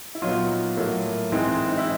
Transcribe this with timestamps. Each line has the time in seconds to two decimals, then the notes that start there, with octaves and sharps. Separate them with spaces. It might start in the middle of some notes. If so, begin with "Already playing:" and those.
0.15 E4
0.22 A#2 F#3 B3 D#4 F4
0.77 A2 F#3 A#3
1.32 G#2 E3 G#3 C4
1.69 D#4
1.78 E4